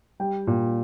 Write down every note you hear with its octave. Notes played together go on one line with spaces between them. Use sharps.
G3 G5
A#2